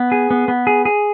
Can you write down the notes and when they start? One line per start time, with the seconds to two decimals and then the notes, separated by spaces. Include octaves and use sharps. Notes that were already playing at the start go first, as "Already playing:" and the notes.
Already playing: B3
0.12 G#4
0.31 B3
0.48 B3
0.67 G#4
0.85 G#4